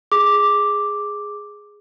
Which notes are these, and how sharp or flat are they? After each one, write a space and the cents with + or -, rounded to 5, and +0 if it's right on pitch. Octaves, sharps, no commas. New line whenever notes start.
G#4 +0 D6 +0